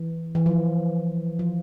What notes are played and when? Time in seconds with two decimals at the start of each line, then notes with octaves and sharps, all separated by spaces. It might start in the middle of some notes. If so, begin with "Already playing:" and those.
Already playing: E3
0.35 E3
0.46 F3
1.39 F3